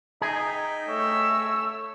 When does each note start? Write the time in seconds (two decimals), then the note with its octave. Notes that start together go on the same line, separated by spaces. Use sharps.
0.22 D#4 G#4 D#5 E5 G5
0.89 A3 C#5 E6